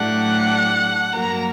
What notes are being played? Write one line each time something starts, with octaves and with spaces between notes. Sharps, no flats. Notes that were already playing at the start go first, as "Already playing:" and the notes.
Already playing: A2 F#3 A3 D4 G4 F#5
G2 F#3 A#3 F#4 A#4 A#5